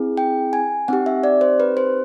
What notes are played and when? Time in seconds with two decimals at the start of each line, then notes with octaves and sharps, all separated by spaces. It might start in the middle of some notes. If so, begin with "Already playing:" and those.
Already playing: C4 E4 G#4
0.17 G5
0.53 G#5
0.88 C4 D#4 G4 F#5
1.06 E5
1.24 D5
1.41 C5
1.60 B4
1.77 C5